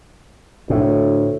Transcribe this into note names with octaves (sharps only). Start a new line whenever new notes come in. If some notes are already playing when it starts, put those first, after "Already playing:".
D2 A2